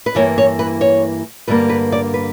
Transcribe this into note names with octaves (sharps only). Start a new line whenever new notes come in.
B4
G2 E3 A#3 C#5
C#5
B4
C#5
G2 D3 G3 A#3 B4
B4
D5
B4